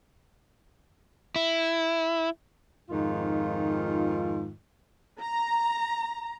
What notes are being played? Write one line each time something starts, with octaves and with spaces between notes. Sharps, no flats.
E4
F2 G#2 D#3 F4
A#5